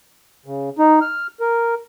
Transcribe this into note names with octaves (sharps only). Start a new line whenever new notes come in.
C#3
D#4
F6
A#4